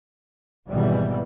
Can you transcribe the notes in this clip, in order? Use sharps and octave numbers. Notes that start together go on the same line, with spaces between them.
G#1 B2 D#3 E3 G3